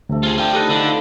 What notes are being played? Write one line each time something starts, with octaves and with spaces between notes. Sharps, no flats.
D2 C3 A3
F4 G#4
A3 D4 F4 D5 G5
B3 D#4 G4 A4 F#6
D3 D#4 F4 A4